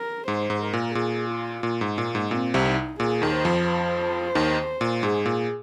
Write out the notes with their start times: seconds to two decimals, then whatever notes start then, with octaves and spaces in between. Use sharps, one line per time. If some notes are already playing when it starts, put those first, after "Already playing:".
Already playing: A#4
0.28 G#2 C5
0.50 G#2
0.62 A#4
0.73 A#2
0.95 A#2 G#4
1.30 F4
1.63 A#2
1.81 G#2
1.98 A#2 A#3
2.15 G#2
2.31 A#2 C4
2.54 C2 C3
2.66 D#4
3.00 A#2 G#4
3.22 D#2 D#3
3.34 C5
3.45 F2 F3
3.68 C5
4.35 D#2 D#3
4.81 A#2
5.03 G#2 G#4
5.26 A#2